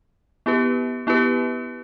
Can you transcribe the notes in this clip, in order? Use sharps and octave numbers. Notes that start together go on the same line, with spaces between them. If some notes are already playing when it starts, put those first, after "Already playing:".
B3 E4 G4 B4
B3 E4 G4 B4